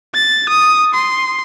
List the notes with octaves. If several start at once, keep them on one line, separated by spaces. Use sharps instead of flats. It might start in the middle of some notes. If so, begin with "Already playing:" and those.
A6
D#6
C6